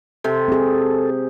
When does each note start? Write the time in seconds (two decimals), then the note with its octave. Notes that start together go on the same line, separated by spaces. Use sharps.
0.24 C3 A4
0.48 C4 G#4